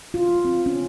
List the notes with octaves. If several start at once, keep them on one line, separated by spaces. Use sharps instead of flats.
F4
C4
C#4